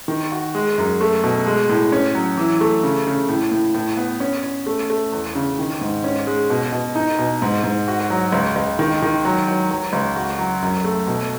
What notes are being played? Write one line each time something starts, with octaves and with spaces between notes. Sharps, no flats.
D#3
F#4
G#3
F#2
A3
B2
G#3
A2
C#4
F#3
E3
A3
C#3
C#3
A2
A2
A2
B3
C#4
C#4
A3
A3
E2
C#3
D#3
G#2
C#4
G#3
B2
B2
D#4
B2
G#2
G#2
F#4
F#3
C#2
C#2
D#3
D#3
F#3
F#3
F#3
C#2
F#4
F#3
F#2
A3
B2